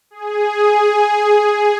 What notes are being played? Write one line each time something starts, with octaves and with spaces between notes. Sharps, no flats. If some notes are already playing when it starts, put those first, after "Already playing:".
G#4